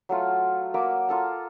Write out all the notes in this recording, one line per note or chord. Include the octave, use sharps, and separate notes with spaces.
F#3 A3 F4
A#3 F#4 E5 D6
F4 A4 A#5